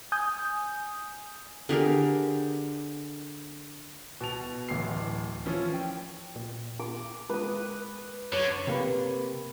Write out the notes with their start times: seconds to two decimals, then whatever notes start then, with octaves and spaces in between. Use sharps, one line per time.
0.12 G#5 D#6 G6
1.69 D3 G4 G#4 A#4
4.21 B2 A5 F7
4.69 D1 A1 C7
5.45 E3 F3 C#4 E4
5.74 G5
6.36 A#2
6.79 D6
7.29 G#3 B4 D#6
8.33 F#2 D3 C#5
8.67 C3 A#3 B4